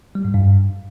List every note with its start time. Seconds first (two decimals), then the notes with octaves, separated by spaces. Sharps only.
0.15 G3
0.25 G#2
0.34 G2